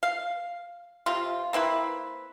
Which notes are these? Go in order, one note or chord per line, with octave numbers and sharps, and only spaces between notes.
F5
C3 F4
A#3 C4 E4 B4